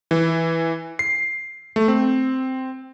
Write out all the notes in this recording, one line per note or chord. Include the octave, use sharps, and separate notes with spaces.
E3
C7
A3
C4